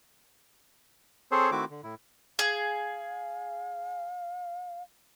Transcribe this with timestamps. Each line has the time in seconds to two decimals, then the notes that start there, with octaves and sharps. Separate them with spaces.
1.32 C4 G#4 A4 C5 C#5
1.52 D#3 A3 C4 E4 F#4 D6
1.70 D3
1.83 A2 E4
2.39 G#4 F5